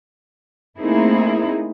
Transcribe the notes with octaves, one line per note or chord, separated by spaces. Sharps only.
A3 A#3 C4 D#4 E4 G#4